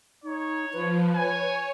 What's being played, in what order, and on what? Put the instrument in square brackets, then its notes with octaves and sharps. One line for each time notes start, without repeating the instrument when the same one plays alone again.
[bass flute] D#4 [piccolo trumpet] C#5
[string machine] F3 [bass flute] B4
[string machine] C#5 [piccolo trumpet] G#5